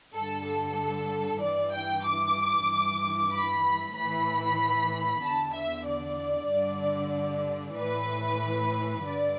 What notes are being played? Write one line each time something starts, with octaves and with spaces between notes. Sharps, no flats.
G2 D3 A4
A4
G2 E3 D5
G5
D6
G2 E3
B5
A2 E3 B5
E2 D3 A5
E5
D5
G2 D3
A2 E3 B4
G2 D3 D5